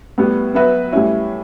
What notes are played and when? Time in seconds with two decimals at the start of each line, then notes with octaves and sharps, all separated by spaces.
0.18 A2 G3 B3
0.54 F#3 B3 F#4 B4 E5
0.92 A2 G3 C#4 E4